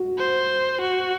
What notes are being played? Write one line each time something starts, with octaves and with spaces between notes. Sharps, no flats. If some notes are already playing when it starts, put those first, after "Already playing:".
Already playing: F#4
C5
F#4